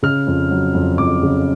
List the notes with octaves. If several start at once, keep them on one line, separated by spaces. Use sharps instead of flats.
C#3 F6
F2
F#3
F2
F2 D6
C#3